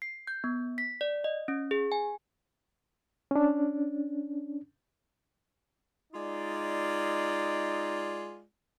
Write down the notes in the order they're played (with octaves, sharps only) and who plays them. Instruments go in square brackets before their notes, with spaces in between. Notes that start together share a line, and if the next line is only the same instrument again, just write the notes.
[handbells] C7
G6
B3
B6
D5
D#5
C#4
G#4
G#5
[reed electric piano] C#4 D4
[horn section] G#3 D#4 F4 D5